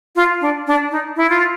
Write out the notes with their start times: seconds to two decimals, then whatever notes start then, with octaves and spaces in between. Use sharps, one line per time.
0.16 F4
0.41 D4
0.67 D4
0.91 D#4
1.16 E4
1.30 F4